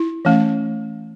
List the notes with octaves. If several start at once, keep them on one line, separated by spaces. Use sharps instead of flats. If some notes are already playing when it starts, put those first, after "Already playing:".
Already playing: E4
E3 A3 C#4